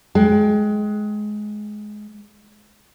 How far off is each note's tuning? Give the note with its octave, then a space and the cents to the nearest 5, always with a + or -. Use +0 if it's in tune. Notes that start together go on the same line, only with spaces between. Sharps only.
G#3 +20 G5 +0